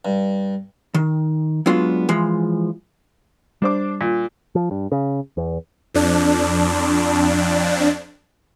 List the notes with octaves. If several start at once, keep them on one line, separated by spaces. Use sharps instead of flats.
G2
D#3
F#3 G#3 B3 D4 F4
E3 F3 G#3
G3 D4 C5 D6
A#2
F3
G2
C#3
E2
F2 D4